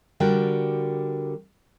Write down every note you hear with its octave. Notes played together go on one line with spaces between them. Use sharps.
D3 G3 F#4 A#4 G5